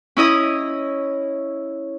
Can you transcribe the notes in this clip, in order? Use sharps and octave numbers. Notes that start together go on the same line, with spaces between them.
C#4 E4 D#5 D#6